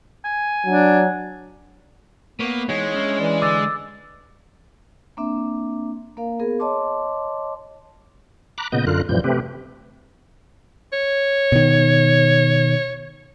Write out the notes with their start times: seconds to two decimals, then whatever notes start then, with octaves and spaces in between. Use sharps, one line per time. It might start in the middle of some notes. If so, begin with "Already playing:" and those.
0.25 G#5
0.66 F#3 D4
2.40 A#3 B3 B4 C#5
2.69 E3 G#3 B3 D#4 C#5
2.94 C#4 D4 E4
3.20 E3 D5
3.42 D3 D6 E6 A6
5.17 A#3 C4 D4 E5
6.17 A#3 A#4 F5
6.40 B3 G#4 A#4
6.60 C#5 D#5 A5 C6 D6
8.58 A#5 B5 D6 F#6
8.72 A#2 C#3 B3 D#5 G6
8.87 F#2 D3 F4 A#4 F#6
9.09 F#2 A#2 E3 F3 G3 G6
9.24 C3 A3 C4 G4 B4
10.93 C#5
11.52 B2 D#3